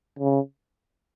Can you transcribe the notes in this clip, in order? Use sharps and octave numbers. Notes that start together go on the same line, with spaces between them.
C#3